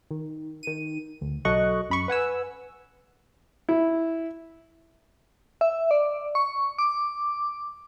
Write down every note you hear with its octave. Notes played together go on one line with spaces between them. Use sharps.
D#3
D#3 D#7
D2
B1 F#3 A4 D#5 C#6 F#6
F#2 B5 C#6
B4 F#5 G#5 E6
E4
E5
D5
C#6
D6